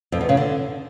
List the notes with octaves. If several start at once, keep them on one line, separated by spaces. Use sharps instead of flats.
F2
E2
C#3
D3